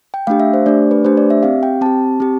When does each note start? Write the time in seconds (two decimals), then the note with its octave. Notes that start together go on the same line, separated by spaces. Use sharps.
0.14 G5
0.27 A3 D4 G4 F5
0.40 E5
0.54 C5
0.66 A3 D4 G4 D5
0.91 B4
1.04 A3 D4 G4 C5
1.17 D5
1.30 E5
1.43 C4 G4 F5
1.63 G5
1.81 C4 G4 A5
2.20 C4 G4